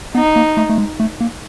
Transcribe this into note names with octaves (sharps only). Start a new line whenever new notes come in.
B3 D#4
A#3
A3
A3
G#3
A3
A#3